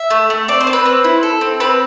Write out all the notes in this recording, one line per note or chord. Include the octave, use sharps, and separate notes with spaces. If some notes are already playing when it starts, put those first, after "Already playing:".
Already playing: E5
A3
A3
C4 D5
C5
C4
B4
C4
E4
A4
C4
C4 B4